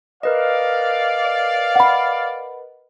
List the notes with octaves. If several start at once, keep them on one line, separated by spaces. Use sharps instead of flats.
A#4 B4 D5 D#5 F5
F#5 B5